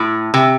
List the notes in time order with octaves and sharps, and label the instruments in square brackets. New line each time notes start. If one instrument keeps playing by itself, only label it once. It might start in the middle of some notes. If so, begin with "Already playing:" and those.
Already playing: [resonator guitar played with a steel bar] A2
C3